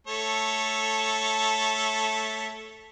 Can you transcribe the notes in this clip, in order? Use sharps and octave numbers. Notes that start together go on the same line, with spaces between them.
A3 A4 C#5